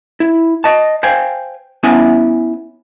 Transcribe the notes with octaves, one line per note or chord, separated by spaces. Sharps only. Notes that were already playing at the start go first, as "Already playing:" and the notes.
E4
D#5 A5
C5 F5 G5 G#5
B3 C#4 E4 E5 G#5